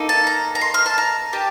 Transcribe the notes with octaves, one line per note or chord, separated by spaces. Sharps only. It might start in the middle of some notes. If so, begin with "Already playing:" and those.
Already playing: A#3 D#4 A4
A5
A#5
A#5
C6
F6
A5
A#5
D#4 G4 A5